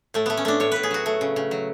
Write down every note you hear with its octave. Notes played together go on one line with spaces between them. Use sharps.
A2 A3
A3 B3
C#4
A3 D4
A2 C#5
A2 B4
G#4
F#3 F#4
A3
C#3
C#3
F#3